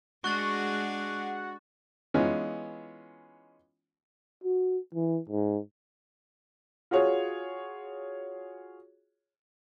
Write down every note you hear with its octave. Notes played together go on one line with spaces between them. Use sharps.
G#3 D4 F#4 G#4 C#6 F#6 A6
E3 G#3 B3 C#4 D#4 F4
F#4
E3
G#2
F4 F#4 G#4 C#5